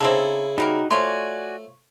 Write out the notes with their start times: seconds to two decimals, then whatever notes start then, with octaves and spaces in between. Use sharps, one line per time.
0.01 C#3 C4 D#4 E4 A4
0.58 G3 A#3 D#4 F#4 A#4
0.91 F3 A3 F#4 C#5 D5 G#5 C6